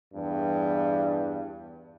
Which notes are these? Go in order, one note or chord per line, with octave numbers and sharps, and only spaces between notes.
E2 G2